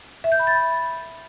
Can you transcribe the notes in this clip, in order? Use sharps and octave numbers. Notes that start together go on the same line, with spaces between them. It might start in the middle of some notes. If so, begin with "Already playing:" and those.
E5
G6
B5
A6
B5